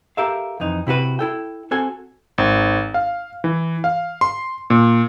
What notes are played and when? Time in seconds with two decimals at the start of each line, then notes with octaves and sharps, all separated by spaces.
0.17 G4 A4 A#4 E5 F5
0.60 F2 E3 D#4
0.87 C3 E4 F#4 B4
1.19 E4 A4 G5
1.71 C4 F#4 A4 G#5
2.38 G#1
2.94 F5
3.44 E3
3.84 F5
4.21 C6
4.70 A#2